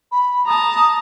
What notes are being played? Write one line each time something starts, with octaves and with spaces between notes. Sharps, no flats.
B5
A5 A#5 D#6